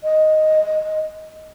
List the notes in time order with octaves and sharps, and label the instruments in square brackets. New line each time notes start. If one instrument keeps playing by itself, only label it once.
[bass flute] D#5